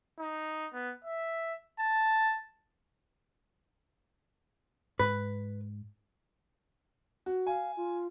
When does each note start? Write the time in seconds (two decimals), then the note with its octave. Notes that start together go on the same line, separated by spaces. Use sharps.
0.19 D#4
0.73 B3
1.05 E5
1.79 A5
4.99 G#2 B4
7.26 F#4
7.47 F5 G#5
7.76 F4